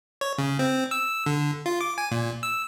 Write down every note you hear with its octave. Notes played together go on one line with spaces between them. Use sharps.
C#5
C#3
C4
E6
D3
F4
D6
G#5
A#2
E6